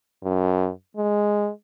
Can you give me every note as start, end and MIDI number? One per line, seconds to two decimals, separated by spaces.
0.23 0.69 42
0.97 1.49 56